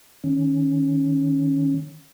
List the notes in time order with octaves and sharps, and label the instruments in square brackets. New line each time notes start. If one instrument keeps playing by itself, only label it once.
[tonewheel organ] D#3 C#4